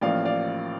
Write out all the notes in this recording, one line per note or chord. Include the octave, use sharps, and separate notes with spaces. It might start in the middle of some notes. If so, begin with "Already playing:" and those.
A1 A2 F3 A#3 D5 F5
D5 F5